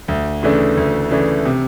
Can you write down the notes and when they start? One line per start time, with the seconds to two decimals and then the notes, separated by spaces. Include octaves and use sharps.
0.08 D2
0.43 C#3 E3 A3 D4
0.77 D2
1.11 C#3 E3 A3 D4
1.45 C3